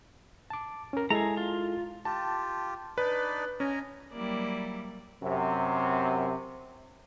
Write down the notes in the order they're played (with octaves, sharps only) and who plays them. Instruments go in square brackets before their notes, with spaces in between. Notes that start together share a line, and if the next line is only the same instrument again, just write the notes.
[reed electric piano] A5 D6
C#4 A#4
[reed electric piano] G#3 E4 A4 [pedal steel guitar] G#4 A#5
[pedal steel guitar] F4
[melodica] F4 G4 [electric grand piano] A5
[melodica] D4 D#4 D5 [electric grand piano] B4
[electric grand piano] C#4 [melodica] D#5 G#5 A#5
[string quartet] F#3 G3 A#3 E4 D5
[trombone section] F#2 C3